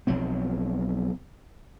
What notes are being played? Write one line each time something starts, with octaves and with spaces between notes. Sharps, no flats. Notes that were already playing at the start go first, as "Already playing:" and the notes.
B1 F3 F#3 C4